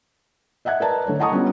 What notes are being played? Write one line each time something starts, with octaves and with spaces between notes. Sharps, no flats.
D#5 E5 F#5 F#6 G#6
A#4 B4 D5 D#5 A5 A#5
D3 A3 C#5
D#5 F#5 A5 A#5 C#6 D#6
G3 B3 C#4 D4 F4